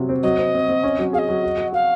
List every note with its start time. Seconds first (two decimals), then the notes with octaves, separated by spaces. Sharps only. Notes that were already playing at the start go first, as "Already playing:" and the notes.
Already playing: C3 F#3
0.09 C4
0.23 F#3 D#5
0.38 C4
0.54 C4
0.69 C4
0.83 C#4
0.99 F#3
1.13 G#4 F5
1.19 D#5
1.29 F#3
1.43 F#4
1.58 F#4
1.73 F#4 F5